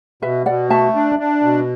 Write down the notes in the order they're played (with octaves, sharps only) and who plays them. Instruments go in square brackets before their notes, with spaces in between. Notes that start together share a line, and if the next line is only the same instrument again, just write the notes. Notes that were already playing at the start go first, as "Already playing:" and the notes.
[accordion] B2 [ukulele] B4 E5
[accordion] B2 [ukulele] D5 F#5
[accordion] A3 [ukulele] E5 A5
[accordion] D4
D4
B2